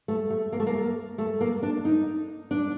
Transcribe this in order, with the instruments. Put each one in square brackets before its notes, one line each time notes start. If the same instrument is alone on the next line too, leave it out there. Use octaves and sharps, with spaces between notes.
[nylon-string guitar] A3
A3
A#3
A3
A#3
A3
A#3
D4
D#4
D4